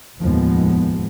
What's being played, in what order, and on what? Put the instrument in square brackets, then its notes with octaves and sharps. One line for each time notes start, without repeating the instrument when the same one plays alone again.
[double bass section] F1 D#2 A2 F3 G#3 B3